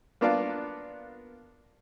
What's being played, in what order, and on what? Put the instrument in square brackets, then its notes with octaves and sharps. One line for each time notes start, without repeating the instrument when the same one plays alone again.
[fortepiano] A#3 B3 D4 F4 D5 F5